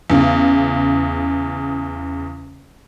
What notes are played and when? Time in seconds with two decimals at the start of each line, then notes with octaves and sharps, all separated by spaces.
0.10 E2 C#3